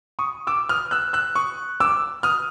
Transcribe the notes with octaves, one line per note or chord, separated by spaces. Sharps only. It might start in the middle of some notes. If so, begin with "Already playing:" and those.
C#6 D#6
D6 E6
D#6 F6
E6 F#6
E6 F#6
C#6 D#6
D6 E6
D#6 F6